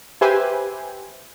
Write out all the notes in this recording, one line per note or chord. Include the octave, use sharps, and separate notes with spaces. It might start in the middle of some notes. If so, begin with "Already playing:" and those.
G4 B4 C5 E5 G#5